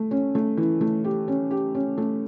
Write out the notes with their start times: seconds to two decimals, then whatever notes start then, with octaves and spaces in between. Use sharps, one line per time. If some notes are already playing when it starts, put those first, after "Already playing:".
Already playing: A3
0.11 C#4
0.35 A3
0.57 E3
0.81 A3
1.04 G4
1.28 C#4
1.51 G4
1.75 C#4
1.98 A3